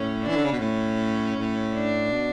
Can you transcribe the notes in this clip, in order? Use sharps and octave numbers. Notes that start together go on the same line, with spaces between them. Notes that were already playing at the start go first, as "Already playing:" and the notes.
Already playing: A2 C#4
D4
E3
D3
C#3
B2
A2 C#4
A2
D4
B2